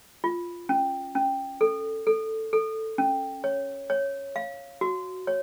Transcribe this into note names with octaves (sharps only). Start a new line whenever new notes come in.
F4
C#4
C#4
A4
A4
A4
C#4
C#5
C#5
F5
F#4
C#5